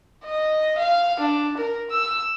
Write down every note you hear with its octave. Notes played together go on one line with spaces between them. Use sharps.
D#5
F5
D4
A#4
E6